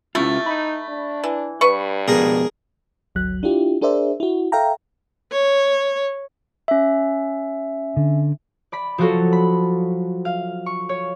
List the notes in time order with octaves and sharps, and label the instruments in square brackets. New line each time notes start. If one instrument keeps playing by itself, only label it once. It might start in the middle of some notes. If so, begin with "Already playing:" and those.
[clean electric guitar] C3 C#4 F4 [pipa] A3 E4
[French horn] D#4 [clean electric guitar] B5
[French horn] D4
[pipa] E3
[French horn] G2 [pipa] B4 C#6
[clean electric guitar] F2 B2 [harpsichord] G#4 A#4
[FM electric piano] G#1 D2 F#3 F#6
D4 E4 F4 G4
D4 G#4 A#4 C5 D5 E5
E4 F#4
A4 E5 F5 G5 A#5
[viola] C#5
[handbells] C#4 E5
[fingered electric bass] D3
[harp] D5 B5 B6
F3 F#3 F4 F#4 A4 C#5
B5
F5
C#6
C#5